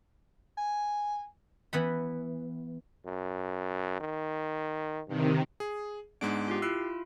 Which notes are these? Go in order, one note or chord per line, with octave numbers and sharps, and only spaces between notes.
G#5
E3 B3 F#5 B5
F#2
D#3
G2 C3 D#3
G#4
G#2 G#3 B3 D4 D7
F4 G4
E4 F4 E6 F#6 C7